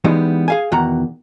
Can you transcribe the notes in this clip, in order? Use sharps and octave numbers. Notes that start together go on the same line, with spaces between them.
E3 G3 G#3 B3 D#4
G#4 F5 G#5
E2 B2 D#3 F#5 A#5